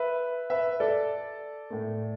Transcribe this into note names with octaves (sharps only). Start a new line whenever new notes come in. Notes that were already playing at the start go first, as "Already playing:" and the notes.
Already playing: B4 E5
B4 E5
A4 D5
A2 A3